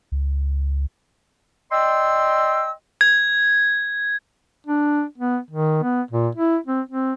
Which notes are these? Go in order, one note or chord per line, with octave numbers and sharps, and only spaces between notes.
C#2
D5 D#5 G5 C6 E6
G#6
D4
B3
D#3
B3
A#2
E4
C4
C4